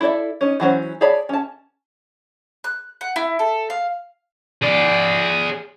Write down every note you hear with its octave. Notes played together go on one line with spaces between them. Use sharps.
E4 A4 C5 D5 E5
C#4 D#4
E3 F#3 C#4 C5
G#4 C#5 D5 A5 B5
C#4 A5
F#6
F#5
E4
A4
F5
G#4 D5